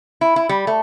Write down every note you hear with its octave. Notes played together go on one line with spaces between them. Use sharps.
E4
E4
G3
A3